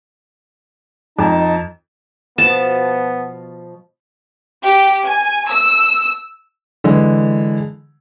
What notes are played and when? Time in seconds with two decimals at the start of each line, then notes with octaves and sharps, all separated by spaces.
1.19 F2 D#4 A5
2.38 B2 F3 B3 A5
4.62 G4
5.03 G#5
5.48 E6
6.84 D3 E3 G#3